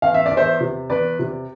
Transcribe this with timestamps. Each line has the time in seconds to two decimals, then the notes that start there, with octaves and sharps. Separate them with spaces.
0.02 E2 F5
0.14 E5
0.26 D5
0.31 E2
0.37 C5 E5
0.60 C3
0.90 E2 B4 D5
1.19 C3